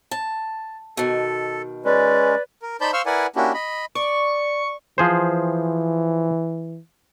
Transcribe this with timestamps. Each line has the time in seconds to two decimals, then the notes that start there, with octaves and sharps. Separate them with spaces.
0.11 A5
0.97 B2 D#3 A4
1.85 G#3 C#4 B4 D5
2.62 A#4
2.81 D#4 C5 D5 A5 B5 G6
2.93 C5 F5 C6 C#6 E6 F6
3.06 E4 A#4 B4 D5 F#5 G#5
3.36 A#3 C#4 D4 E4 F#4 G4
3.54 D#5 B5
3.95 D5 C#6
4.98 E3 F3 G#4 C5